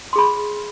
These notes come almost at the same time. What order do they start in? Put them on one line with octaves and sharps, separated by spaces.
C6 G#4 B5